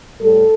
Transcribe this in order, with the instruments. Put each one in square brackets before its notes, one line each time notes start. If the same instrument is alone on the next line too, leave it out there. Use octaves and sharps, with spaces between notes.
[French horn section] A2 G3 A4